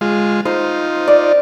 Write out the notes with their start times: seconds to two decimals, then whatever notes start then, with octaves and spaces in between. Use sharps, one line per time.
0.01 G#3 F4
0.45 D#4 F4 C5
1.08 D5